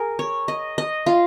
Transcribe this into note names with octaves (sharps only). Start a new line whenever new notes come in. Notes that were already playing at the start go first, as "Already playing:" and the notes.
Already playing: G#4 A#4
C#5
D#5
D#5
F4